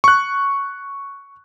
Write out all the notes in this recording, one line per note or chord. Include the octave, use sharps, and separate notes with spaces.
C#6 F#6